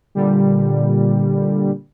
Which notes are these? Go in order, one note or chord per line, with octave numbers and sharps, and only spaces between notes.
A#2 D3 G3